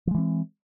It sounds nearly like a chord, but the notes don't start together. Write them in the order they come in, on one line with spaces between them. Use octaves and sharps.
F3 G#3 E3 C4